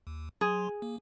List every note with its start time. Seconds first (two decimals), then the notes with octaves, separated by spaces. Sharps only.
0.07 D#2
0.41 F#3 G#4 C6
0.82 A#3